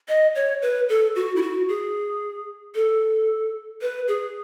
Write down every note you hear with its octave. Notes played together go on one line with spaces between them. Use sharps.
D#5
C#5
B4
A4
F#4
E4
F#4
G#4
A4
B4
G#4